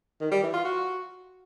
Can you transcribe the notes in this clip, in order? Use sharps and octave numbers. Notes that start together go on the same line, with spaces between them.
D#3
G3
E3
F4
F#4